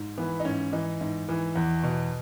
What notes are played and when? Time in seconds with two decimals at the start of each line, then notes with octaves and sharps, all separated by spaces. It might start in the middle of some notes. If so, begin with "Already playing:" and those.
Already playing: G#2
0.18 E3 B3
0.40 D#4
0.45 G#2 C#4
0.73 E3 D#4
1.01 G#2
1.29 E3
1.56 E2
1.83 B2